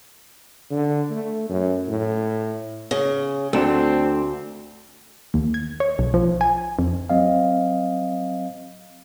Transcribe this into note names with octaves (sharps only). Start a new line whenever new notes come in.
D3
A3
F#2
A2
C#3
D2 A3 C4 D4
D#2
G#6
C#5
B1
F3
G#5
F2
F#3 C4 D#5 F5